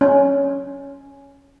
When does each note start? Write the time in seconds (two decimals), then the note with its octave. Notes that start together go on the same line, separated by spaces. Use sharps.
0.01 C#4